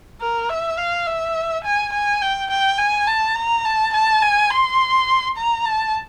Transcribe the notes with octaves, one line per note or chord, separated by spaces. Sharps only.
A#4
E5
F5
E5
G#5
G#5
G5
G5
G#5
A5
A#5
A5
A5
G#5
C6
A#5
A5